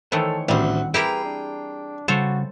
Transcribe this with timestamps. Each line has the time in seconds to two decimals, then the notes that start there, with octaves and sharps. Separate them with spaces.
0.12 D#3 E3 A3 A4 C5 C#5
0.49 A1 D2 D#3 G3 C4 F#5
0.94 E4 G4 G#4 A#4 B4 G5 A#5
1.25 D4
2.08 C#3 G3 F#4 A4 C5 C#5